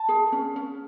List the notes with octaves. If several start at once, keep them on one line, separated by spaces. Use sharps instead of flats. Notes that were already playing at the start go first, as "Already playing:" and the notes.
Already playing: A5
G#4
C#4
C#4